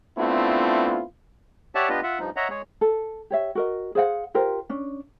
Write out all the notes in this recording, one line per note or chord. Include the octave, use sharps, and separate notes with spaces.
A3 B3 C4 D4 E4 F4
G4 C#5 D5 E5 F#5 A5
B3 D4 F4 G4 B4 D#5
F4 E5 F#5
G2 F3 D#4
C#5 D#5 E5 F#5 A#5
G#3 G#4 C#5
A4
G4 C#5 E5
F#4 A#4 D#5
G#4 C5 F5 F#5
F4 G4 A#4 C5
C#4 D4